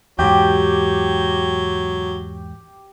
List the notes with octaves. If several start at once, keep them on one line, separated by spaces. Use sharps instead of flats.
E2 G#2 F#3 G4